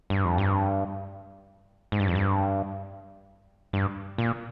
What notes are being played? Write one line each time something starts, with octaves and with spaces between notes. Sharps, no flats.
G2
F2
G2
G#2
G2
F2
G2
G2
A#2